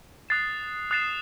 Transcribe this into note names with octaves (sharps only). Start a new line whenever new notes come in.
D#6 F#6 A6 C7 E7
D#6 F#6 A6 C7 E7